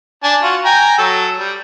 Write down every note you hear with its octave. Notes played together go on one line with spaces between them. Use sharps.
D4 G#5 A5
F4 F#4
G5 G#5 A#5
F#3 A4
G3